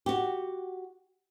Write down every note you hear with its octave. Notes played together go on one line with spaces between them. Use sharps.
F#4 G4